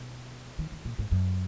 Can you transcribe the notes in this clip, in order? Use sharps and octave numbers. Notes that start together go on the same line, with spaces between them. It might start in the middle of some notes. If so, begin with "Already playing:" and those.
Already playing: B2
D#3
D#3
A#2
G#2
F#2